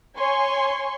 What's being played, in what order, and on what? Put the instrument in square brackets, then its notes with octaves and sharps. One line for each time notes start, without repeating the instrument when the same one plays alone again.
[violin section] C#5 G#5 C6 C#6